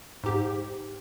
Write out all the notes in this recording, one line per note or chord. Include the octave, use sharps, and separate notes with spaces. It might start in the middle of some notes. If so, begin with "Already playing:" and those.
G#2 G4